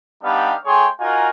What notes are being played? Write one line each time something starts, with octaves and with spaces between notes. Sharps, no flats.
G3 B3 D4 D#4 G4 F5
A3 G#4 C#5 G5 G#5 C6
D#4 F4 F#4 A#4 G#5